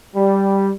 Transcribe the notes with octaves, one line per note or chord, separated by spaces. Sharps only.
G3